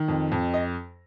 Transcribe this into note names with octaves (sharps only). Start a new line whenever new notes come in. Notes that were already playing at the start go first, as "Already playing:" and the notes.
Already playing: D#3
F2
F2
D#5